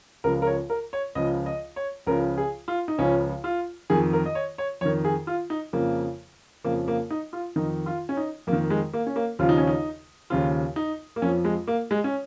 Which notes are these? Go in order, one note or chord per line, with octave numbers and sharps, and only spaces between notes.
C#2 C#3 F3 A#4
A#4
C#5
A#4
C#5
C#2 C#3 F3 D#5
D#5
C#5
C#2 C#3 F3 A#4
G#4
F4
D#4
C#2 C#3 F3 C#4
F4
F2 D#3 G#4
A#4
D#5
C#5
C#5
F2 D#3 C#5
G#4
F4
D#4
F2 C#3 F3 A#3
F2 C#3 F3 A#3
A#3
D#4
F4
F2 D#3 D#4
F4
C#4
D#4
F2 A#3
D#3
G#3
A#3
C#4
A#3
D#2 C#3 F3 F4
D#4
C#4
D#4
D#2 C#3 F3 F4
D#4
A#3
F2 F3 C#4
G#3
A#3
G#3
C#4